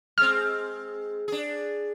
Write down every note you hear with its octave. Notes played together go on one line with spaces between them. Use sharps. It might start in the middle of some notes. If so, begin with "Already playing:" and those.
G#3 C4 F6
D4 G#4